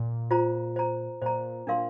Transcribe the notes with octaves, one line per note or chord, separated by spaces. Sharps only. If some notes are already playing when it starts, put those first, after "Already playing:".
Already playing: A#2
F4 C5 A#5
C5 A#5
A#2 C5 A#5
A#2 D4 A#4 F5 C6